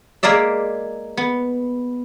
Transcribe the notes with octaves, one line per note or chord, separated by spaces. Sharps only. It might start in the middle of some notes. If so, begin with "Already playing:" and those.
G#3 A#3 A#4 D5 E5
B3